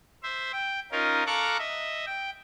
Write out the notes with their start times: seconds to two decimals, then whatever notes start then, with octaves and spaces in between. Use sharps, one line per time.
0.23 C5 E5
0.53 G5
0.92 C#4 D#4 F4 A#4
1.26 A4 F5 A#5 C#6 D6 F#6
1.59 D#5 E5
2.06 G5